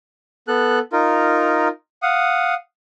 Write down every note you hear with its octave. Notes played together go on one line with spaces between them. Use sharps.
B3 A4 F#6
D#4 F4 A#4
F5 F#5 D#6